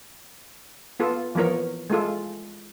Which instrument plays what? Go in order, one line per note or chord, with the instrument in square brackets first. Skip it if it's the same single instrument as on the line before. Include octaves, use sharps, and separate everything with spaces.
[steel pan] B3 F4 A4
E3 F3 B3 A#4 C#5
G#3 A3 F4 A4